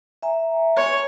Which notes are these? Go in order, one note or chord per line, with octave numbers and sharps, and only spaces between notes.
E5 G#5 A#5
C#5